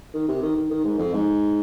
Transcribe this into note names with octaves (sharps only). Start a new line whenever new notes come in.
D#3
C3
D#3
D#3
D#3
G#2
F2
G#2